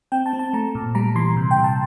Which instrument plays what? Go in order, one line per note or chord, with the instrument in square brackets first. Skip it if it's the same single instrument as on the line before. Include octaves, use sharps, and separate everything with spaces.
[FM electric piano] C4 G5
A5
C4
A5
A3 A#5
A#2
G3 A#5
E3 C6
C3
G5
C3
A5